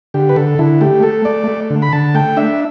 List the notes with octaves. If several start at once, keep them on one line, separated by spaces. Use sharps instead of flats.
D3 G4
B4
D3 A4
D3 E4
A3 G4
A3 A4
A3 D5
A3
D3
B5
D3 A5
A3 G5
D4 E5